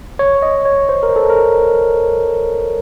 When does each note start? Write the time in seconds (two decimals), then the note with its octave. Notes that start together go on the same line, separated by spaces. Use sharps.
0.19 C#5
0.42 D#5
0.65 C#5
0.89 C5
1.03 A#4
1.16 A4
1.29 A#4